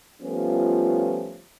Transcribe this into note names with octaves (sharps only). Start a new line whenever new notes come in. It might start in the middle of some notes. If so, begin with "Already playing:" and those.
F3 G3 A3 B3 C#4 F4